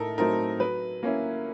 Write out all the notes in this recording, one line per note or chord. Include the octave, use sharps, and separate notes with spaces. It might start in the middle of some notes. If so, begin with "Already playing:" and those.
Already playing: A2 A3 D#4 A4 A#4
F#3 A3 C4 D#4 A#4
F#3 B4
A#3 C#4 E4